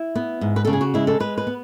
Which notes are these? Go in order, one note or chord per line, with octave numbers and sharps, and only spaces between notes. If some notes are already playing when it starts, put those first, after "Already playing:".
Already playing: E4
B3
G#2
B4
C#3 A4
G#4
F#4
G#3 E4
A4
G#3 B4
B4
B3